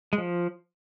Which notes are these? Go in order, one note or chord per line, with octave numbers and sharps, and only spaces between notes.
G#3
F3